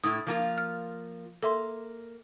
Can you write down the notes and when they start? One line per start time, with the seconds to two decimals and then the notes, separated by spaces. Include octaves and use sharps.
0.04 A2 E4 D#6
0.27 F3 A#3 F4
0.58 F6
1.43 A#3 A4 E5 C6